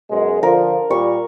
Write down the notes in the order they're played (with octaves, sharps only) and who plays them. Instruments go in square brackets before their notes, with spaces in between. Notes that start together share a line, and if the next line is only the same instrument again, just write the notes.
[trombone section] F#2 B2 G#3
[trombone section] D3 F3 [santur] A#4
[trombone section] A#2 G3 [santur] C#6